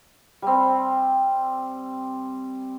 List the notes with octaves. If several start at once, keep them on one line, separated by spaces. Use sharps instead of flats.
G3 C4